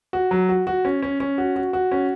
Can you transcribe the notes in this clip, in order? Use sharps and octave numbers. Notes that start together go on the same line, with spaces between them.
F#4
F#3
F#4
F#4
C#4
C#4
C#4
F#4
F#4
F#4
C#4